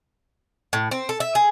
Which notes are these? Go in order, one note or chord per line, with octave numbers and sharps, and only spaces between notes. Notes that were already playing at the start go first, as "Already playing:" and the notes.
A2
C4
A4
E5
G#4